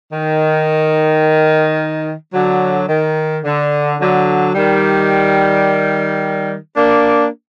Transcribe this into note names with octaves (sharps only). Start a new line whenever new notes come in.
D#3
D3 F#3
D#3
D3
D3 F#3
D#3 G3
A#3 D4